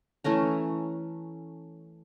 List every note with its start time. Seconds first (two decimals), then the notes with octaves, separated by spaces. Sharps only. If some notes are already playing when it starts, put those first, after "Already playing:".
0.24 E3 A3 C#4 A#5